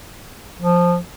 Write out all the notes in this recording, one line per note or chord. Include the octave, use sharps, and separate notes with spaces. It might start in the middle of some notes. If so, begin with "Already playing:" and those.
F3